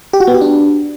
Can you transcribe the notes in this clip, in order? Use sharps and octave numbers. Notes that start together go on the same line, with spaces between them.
G4
F#4
B3
G4
D4